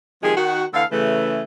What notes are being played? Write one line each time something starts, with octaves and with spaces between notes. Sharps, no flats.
C3 D#3 F3 G#3 G4 G#4
D#3 F#4
D3 E3 A3 A4 F5
C#3 E3 A3